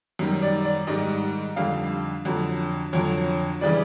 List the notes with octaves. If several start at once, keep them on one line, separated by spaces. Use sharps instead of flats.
F#2 D#3 G3
D5
D5
G#2 D#3 G3 D#5
F2 D3 G3 F5
F2 D3 F#3
F2 D3 F#3 C#5
C#3 E3 G3 D5